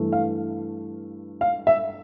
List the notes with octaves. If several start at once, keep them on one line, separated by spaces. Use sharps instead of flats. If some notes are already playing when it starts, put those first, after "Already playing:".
Already playing: G2 E3 A3
F5
F5
E5